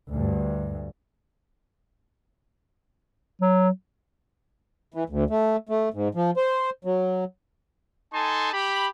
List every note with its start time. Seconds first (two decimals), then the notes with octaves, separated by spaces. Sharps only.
0.11 D2 G2
3.41 F#3
4.94 E3
5.09 D2
5.30 A3
5.69 A3
5.94 G#2
6.15 F3
6.37 C5
6.85 F#3
8.13 D#4 A4 G#5 A5 C6
8.53 G4 B5